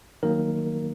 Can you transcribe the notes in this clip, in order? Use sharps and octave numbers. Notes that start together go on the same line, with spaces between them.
D#3 F#3 A#3 A#4